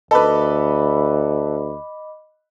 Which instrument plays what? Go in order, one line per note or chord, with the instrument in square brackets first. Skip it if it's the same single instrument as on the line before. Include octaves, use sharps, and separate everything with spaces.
[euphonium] D2 [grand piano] A4 B4 [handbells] D#5 B5 D6